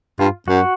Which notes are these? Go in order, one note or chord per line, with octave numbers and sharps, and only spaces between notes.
G2 F4
F#2 F#4